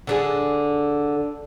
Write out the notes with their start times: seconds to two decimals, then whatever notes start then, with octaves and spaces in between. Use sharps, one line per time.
0.07 D3 D4 G#4